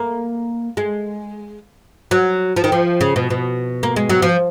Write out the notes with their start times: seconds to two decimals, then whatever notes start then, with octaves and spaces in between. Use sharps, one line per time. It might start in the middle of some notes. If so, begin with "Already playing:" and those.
Already playing: A#3
0.77 G#3
2.11 F#3
2.56 F3
2.64 D#3
2.72 F3
3.01 C#3
3.16 B2
3.30 B2
3.83 A#3
3.96 G#3
4.09 F#3
4.22 F3